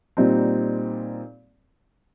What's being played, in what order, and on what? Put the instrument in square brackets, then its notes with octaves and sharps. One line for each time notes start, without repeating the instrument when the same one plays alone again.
[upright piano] A#2 G3 C4 D#4